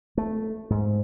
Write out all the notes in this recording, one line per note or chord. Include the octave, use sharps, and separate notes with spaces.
A3
G#2